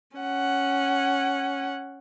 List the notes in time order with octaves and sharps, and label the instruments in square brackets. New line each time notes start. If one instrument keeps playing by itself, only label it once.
[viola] C#4 F#5